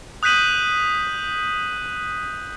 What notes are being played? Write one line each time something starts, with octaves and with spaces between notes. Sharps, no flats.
D#6 F#6 G6 B6 D#7 F#7